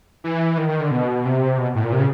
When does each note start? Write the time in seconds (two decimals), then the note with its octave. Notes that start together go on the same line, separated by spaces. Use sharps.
0.24 E3
0.58 D#3
0.68 D#3
0.80 D3
0.91 B2
1.25 C3
1.58 B2
1.75 A2
1.84 A#2
1.92 C3
1.98 C#3